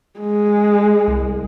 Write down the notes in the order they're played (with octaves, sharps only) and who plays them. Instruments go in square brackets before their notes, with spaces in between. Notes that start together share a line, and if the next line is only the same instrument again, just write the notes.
[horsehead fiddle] G#3
[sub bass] C2